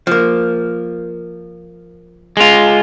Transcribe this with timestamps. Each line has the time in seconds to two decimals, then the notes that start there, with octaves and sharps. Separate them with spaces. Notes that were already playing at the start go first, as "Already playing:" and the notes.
0.07 F3 A#3
2.37 G#3 F4